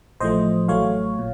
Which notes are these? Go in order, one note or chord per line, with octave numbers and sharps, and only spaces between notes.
A1 A2 F3 A3 C5 D#5
A1 A2 F#3 A3 C#5 F5
A#2